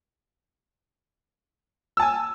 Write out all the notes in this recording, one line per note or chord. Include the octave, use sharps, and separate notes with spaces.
G#5 A5 E6